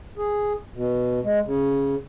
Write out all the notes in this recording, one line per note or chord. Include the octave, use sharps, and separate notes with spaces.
G#4
B2
G#3
C#3